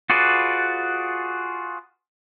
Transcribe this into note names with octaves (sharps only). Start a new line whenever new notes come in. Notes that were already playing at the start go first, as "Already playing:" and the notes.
F4 F#4 G#4 B4 D5